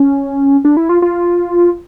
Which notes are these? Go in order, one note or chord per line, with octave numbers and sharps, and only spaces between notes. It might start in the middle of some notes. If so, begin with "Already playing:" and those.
Already playing: C#4
D4
E4
F4
F4